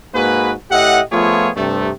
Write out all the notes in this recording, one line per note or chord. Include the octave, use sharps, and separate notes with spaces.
G#2 A#3 F#4 G#4 B4
A2 G4 D#5 E5 F#5
F3 A3 B3 F4 G#4 C#5
G2 C3 A3